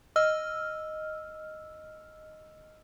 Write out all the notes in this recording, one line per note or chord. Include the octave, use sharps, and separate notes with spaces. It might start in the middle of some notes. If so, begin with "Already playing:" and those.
D#5 E6 F6